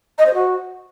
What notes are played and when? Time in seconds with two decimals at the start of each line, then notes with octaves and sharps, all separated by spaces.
0.18 D#5
0.26 C5
0.34 F#4